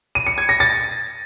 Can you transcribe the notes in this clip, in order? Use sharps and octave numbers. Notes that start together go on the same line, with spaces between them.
D#7
C#7
G#6
A#6
A6